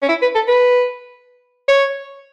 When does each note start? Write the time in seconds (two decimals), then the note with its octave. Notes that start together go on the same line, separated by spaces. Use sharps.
0.02 C#4
0.09 E4
0.22 B4
0.35 A4
0.48 B4
1.68 C#5